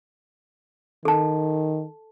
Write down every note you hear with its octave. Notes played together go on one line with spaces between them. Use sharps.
D#3 A4 A5